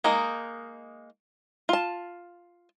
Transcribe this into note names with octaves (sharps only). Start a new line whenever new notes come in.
G#3 A#3 D#4 A#4
F4 A5